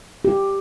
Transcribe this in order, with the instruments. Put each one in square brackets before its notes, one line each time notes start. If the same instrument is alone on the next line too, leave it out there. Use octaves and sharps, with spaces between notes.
[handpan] G4